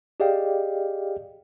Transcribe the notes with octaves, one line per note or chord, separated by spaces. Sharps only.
G4 G#4 D5 D#5 F5 G5